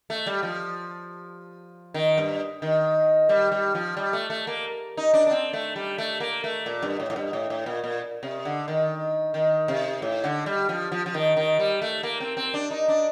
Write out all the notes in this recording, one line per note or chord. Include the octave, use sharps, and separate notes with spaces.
A3
G3
F3
D#3
G2
D#3
G3
G3
F3
G3
A3
A3
A#3
D#4
D4
D4
C4
A3
G3
A3
A#3
A3
A#2
G2
A2
A2
G2
A2
A2
A#2
A#2
C3
D3
D#3
D#3
C3
A2
D3
G3
F3
F3
F3
D#3
D#3
G3
A3
A#3
C4
C4
D4
D#4
D4